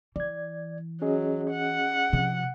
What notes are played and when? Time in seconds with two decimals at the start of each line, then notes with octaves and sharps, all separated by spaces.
0.16 E3 D5 G#6
1.02 F#3 C#4 G#4 D#5
1.51 F#5
2.13 C3 F3